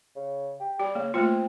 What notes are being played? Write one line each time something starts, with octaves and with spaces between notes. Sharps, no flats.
C#3
G4
G3 G4
C#3 A#3
A3 A#3 C4 F4